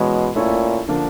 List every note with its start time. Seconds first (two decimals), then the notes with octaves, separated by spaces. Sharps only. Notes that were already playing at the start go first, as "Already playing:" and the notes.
Already playing: B2 E3 G#3 C#4 E4 G#4
0.35 A#2 A3 C#4 E4 A4
0.88 D3 F3 A#3 D4